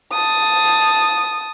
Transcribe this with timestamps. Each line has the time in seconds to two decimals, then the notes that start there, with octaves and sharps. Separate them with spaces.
0.13 A5 D#6